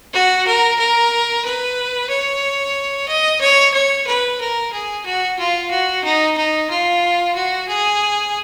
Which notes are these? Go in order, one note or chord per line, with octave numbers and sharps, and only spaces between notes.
F#4
A#4
A#4
B4
C#5
D#5
C#5
C#5
B4
A#4
G#4
F#4
F4
F#4
D#4
D#4
F4
F#4
G#4